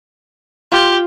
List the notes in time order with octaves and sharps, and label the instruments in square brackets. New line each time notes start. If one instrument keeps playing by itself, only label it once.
[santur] F4 [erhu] G4